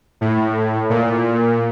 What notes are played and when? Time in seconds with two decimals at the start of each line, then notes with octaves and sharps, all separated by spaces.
0.21 A2
0.90 A#2